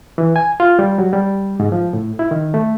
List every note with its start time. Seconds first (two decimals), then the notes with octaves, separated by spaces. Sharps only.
0.18 E3
0.36 G#5
0.60 F4
0.79 G3
0.98 F#3
1.13 G3
1.60 G#2
1.72 F3
1.93 A2
2.19 E4
2.31 D#3
2.54 A3